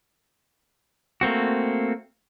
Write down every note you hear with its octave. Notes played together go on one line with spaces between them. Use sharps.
A3 A#3 C4 F#4